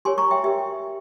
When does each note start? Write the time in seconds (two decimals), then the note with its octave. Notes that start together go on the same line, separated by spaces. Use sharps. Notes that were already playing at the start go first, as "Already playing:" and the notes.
0.05 G4 A#4 C#5 G#5 C6
0.18 A#5 C#6
0.31 E5 G5
0.44 G4 A#4 E5